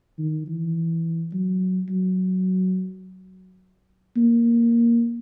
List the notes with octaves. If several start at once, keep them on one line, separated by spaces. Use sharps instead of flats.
D#3
E3
F#3
F#3
A#3